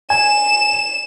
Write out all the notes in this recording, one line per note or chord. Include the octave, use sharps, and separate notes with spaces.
G#5 E7